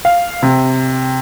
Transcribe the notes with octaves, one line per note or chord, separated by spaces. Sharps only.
F5
C3